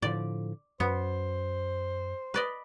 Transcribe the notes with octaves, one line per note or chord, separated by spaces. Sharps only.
A2 D3 F3 D5
F#2 B3 C5
B4 D5 D#5